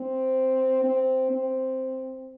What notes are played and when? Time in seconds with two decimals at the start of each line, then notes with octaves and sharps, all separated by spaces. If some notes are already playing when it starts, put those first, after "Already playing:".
Already playing: C4
0.84 C4
1.31 C4